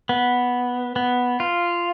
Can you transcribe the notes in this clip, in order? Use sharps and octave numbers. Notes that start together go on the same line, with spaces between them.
B3
B3
F4